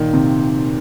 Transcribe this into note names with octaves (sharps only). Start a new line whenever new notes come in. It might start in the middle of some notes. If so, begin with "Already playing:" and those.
Already playing: A#2 D#3
C3